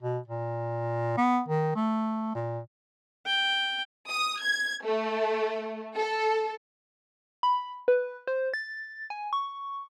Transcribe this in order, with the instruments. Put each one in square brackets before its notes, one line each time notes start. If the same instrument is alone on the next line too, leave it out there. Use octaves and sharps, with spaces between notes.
[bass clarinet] B2
A#2
B3
D#3
A3
A#2
[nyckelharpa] G5
[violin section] D#6
G#6
A3
A4
[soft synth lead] B5
B4
C5
A6
G#5
C#6